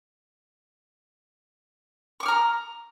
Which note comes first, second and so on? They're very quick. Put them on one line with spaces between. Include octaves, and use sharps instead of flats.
C#6 D6 F6 A#5